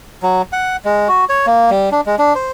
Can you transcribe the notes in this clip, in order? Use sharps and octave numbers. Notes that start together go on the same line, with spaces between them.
F#3
F#5
G#3
F#4
C#5
A#3
G3
D4
G#3
D4
C5